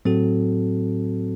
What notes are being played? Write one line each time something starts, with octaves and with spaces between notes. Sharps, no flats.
A2 F#3 C4 F#4 A4